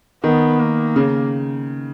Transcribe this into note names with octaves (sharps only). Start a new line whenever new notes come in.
D#3 B3
A#3
C#3